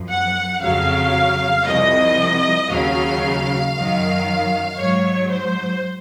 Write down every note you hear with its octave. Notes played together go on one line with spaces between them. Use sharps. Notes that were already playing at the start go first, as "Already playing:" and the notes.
Already playing: F#2 F3
F#5
F2 C#3 F#3 F5
C2 C3 F3 D#5
D#2 C#3 F#3 F5
F#2 D#3 F#3
G#2 F#3 C#5
C5